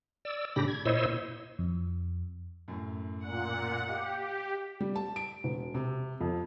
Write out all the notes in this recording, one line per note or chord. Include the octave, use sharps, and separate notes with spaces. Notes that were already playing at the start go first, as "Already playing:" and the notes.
D5 E6
A2 C#3 D4 G4 B5 A#6
G#6
A#2 E4 C5 C#5 D#5 E6
F2
F#2 A2
A#2 F#5
G4 D#5 F5
G3
A5
D7
E1
C3
F2